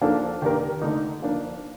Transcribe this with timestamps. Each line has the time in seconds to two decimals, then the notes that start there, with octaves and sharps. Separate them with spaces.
0.01 F3 A#3 D4 A4
0.42 D#3 A#3 D4 G4 A#4
0.82 D3 A3 D#4
1.22 F3 A#3 D4